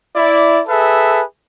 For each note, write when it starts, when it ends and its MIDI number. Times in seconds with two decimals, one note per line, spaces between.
0.16 0.61 64
0.16 0.61 74
0.68 1.23 68
0.68 1.23 69
0.68 1.23 71
0.68 1.23 76